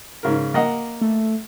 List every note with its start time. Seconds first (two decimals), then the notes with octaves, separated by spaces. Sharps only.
0.23 G#2 C#3 A#4
0.54 A#3 D#5 F#5
1.01 A3